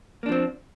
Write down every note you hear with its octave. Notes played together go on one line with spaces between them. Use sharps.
F3 A#3 C4 D4